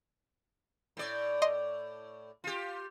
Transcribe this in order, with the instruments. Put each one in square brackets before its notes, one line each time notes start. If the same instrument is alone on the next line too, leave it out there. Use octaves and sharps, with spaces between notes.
[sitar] A2 D5
[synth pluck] D#5 C6
[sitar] F4 G4